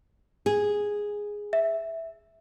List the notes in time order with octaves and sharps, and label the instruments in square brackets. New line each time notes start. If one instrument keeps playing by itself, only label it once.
[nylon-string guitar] G#4
[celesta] E5